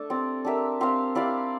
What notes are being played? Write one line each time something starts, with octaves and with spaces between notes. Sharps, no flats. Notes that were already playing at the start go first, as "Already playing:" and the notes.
Already playing: A3 D4 A4
C4 G4 D5
D4 G4 A#4 E5
C4 G4 C5 F5
E4 G4 D5 F5